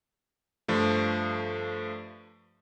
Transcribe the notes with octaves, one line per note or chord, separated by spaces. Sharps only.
G2 F3 A3